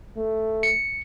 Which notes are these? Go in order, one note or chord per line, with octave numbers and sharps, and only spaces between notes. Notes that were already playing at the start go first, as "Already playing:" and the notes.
A3
C#7